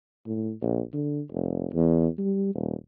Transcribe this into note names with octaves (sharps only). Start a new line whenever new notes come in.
A2
A#1
D3
F1
E2
G3
D#1